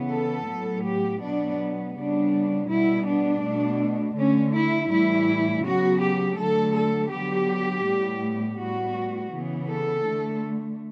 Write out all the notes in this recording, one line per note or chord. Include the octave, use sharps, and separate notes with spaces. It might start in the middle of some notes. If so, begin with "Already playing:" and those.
Already playing: C#3 E3 B3
A4
A2 F#3 B3
G4
B2 F#3 B3 D4
C#3 G3 B3 D4
B2 G3 B3 E4
D4
B2 A3
D3 A3 C#4
E4
A2 E3 G3 E4
C#3 F#3 B3 F#4
G4
D3 F#3 A3 A4
A4
D3 F#3 B3 G4
A2 G3 B3
A2 G3 B3 F#4
C#3 E3 B3
A4
D3 A3